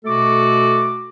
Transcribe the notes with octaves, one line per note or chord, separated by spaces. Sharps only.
B2 A3 F#4 A4 D6